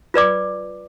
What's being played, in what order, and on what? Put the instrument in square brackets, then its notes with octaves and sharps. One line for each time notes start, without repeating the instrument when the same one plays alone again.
[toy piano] F4 B4 D5 D6